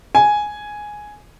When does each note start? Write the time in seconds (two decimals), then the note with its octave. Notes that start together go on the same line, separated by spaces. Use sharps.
0.15 G#5